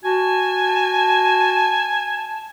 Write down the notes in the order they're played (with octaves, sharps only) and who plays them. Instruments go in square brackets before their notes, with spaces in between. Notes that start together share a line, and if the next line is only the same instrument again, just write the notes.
[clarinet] F#4 [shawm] G#5 [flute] A5